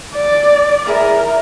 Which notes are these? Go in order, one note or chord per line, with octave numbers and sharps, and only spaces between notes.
D5
E4 G#4 A#4 E5